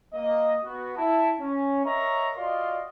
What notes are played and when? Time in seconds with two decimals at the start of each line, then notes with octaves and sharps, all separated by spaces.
0.13 A#3 D#5
0.64 B3 F#4
0.97 E4 A5
1.39 C#4
1.85 A#4 C#5 D#5 E5 A#5 C#6
2.36 F4 F#4 D5 D#5 F5 C6